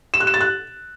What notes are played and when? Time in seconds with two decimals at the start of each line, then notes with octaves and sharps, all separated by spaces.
0.14 E7
0.20 F#6
0.27 E7
0.34 A6
0.41 F#6